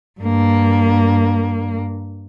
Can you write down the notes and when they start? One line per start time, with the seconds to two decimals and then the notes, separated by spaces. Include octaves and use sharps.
0.21 G2 A#3